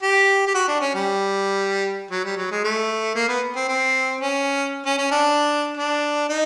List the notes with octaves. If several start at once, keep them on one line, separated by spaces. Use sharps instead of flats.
G4
G4
F#4
D4
C#4
G3
F#3
G3
F#3
G#3
A3
A#3
B3
C4
C4
C#4
C#4
C#4
D4
D4
D#4